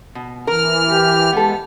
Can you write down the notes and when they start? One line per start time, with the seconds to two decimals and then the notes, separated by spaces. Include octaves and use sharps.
0.15 B2
0.47 E3 A#4 F6
0.87 G4
1.33 G#3 B3 A4